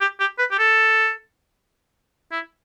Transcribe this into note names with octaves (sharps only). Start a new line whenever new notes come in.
G4
G4
B4
G4
A4
E4